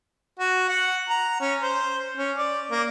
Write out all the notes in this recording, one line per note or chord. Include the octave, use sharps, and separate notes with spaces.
F#4
F#5
A#5
C#4
C5
C#4
D5
A#3